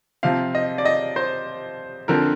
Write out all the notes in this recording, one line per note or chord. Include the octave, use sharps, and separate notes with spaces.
C3 F3 C4 F5
D#5
D5
D#5
C5
D3 F3 C4 A#4